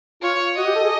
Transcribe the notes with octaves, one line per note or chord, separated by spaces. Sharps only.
F4 C#5
F#4 D#5
G4
A4
G#4